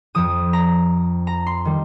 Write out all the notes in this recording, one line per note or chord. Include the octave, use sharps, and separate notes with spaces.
F2 F3 D#6
A#5
A#5
C6
D#3 G3